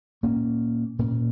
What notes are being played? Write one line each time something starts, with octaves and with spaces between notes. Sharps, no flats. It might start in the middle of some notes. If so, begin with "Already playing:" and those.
A#2 A#3 C#4
A#2 A#3 C#4